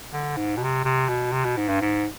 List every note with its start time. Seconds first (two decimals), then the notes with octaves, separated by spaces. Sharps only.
0.13 D3
0.37 G#2
0.57 B2
0.61 C3
0.85 C3
1.09 B2
1.32 C3
1.45 B2
1.57 G#2
1.69 G2
1.81 G#2